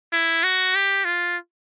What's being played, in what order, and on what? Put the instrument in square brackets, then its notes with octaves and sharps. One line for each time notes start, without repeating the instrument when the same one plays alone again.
[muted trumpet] E4
F#4
G4
F4